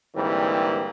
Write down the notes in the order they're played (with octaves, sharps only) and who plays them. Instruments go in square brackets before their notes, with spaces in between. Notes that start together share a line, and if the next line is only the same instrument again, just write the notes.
[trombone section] G#2 D3 E3 G3 A#3 C4